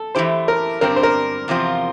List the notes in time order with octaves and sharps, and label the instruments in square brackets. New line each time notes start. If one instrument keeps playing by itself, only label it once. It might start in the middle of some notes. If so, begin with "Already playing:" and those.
Already playing: [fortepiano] A4
[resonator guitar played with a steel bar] E3 A3 E4 G4 [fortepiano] C5
[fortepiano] A#4
[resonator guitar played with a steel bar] G2 D3 G3 C4 [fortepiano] A#4
[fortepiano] C5
A#4
[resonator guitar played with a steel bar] E2 C3 F3 C4 F4